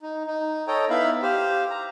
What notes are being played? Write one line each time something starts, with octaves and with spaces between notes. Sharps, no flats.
D#4
D#4
A4 C#5 D#5 G5 A#5
B3 D#4 E4 E5 F5 B5
G4 C5 F5
A#5